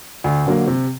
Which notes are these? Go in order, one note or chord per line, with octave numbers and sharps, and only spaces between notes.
D2
D3 F#3 A#3
C3